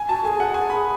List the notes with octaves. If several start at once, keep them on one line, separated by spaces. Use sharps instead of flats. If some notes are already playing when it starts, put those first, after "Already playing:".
Already playing: G#5
F#4 A5
G#4 A4 G#5
F#5
G#5
B5